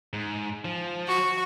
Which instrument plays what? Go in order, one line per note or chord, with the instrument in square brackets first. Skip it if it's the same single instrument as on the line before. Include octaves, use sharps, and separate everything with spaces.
[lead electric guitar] G#2
F3
[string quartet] F#4